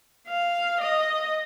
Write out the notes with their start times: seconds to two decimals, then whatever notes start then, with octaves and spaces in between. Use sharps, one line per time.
0.28 F5
0.81 D#5